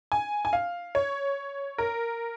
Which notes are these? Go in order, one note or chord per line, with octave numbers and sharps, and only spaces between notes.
G#5
G#5
F5
C#5
A#4